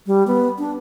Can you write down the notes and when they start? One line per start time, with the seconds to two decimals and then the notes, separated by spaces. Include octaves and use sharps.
0.07 G3
0.27 B3
0.59 D4